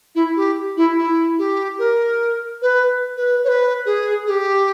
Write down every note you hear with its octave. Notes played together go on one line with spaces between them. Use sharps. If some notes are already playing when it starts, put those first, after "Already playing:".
E4
G4
E4
E4
G4
A#4
B4
B4
C#5
B4
G#4
G#4
G4